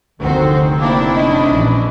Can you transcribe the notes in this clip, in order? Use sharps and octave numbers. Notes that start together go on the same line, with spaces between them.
F1 D2 D3 D#3 C4 F#4 C5
A#3 D4 E4
C#4 D#4 D#5
A#1 E3